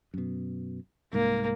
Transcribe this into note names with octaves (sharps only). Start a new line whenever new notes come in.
F#2 B2
C2 G#2 A#3